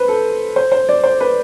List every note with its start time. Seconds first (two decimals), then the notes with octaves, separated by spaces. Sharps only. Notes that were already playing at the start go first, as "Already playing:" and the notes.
Already playing: B4 C5
0.08 A4
0.56 C5
0.72 C5
0.89 D5
1.04 C5
1.20 B4